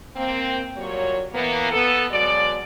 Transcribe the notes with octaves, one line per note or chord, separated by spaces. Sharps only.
A#3 C4
A#2 F#3 G3 C#5
E3 A#3 B3
B3 A4
B2 F#3 G#3 D5